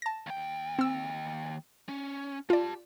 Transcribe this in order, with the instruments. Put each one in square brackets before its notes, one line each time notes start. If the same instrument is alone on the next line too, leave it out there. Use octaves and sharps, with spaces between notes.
[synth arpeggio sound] A5 A#6
[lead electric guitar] D#2 G5
[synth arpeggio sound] C4 E6
[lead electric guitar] C#4
[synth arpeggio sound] F4 D5 [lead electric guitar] G4 A5